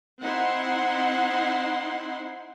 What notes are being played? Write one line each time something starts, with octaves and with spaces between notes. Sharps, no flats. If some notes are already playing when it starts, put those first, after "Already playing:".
C4 D#4 E4 F#5 C6